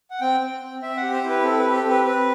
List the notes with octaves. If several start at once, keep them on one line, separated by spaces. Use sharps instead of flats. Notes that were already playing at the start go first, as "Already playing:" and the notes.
F#5
C4 G5
C4
C4
C4 E5
F#5
G4
C5
E4
B4
C4 A4
B4
G4
A4
C4
B4
C4 B4